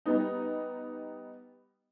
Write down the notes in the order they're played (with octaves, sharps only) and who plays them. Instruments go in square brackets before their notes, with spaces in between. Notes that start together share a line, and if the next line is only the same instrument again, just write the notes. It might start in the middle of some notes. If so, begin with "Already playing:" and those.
[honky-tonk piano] G3 B3 D#4